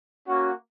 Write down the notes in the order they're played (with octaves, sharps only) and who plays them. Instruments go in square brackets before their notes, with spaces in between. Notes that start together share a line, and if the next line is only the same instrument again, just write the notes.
[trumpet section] A#3 C#4 F#4